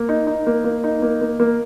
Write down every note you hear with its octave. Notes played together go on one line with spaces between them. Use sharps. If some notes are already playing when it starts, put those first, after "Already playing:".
Already playing: A#3
D#4
D#4
A#3
A#3
D#4
A#3
A#3
A#3